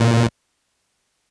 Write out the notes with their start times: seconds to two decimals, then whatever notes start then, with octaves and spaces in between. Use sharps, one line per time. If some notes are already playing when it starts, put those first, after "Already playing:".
Already playing: A#2